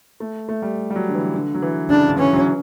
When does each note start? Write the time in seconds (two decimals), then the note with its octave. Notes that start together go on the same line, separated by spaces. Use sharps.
0.20 A3
0.49 A3
0.62 G3
0.90 G3
0.96 F#3
1.09 D3
1.15 E3
1.33 D3
1.54 F#3
1.62 E3
1.90 C#3 D4
2.05 D3
2.18 E3 C#4
2.33 F#3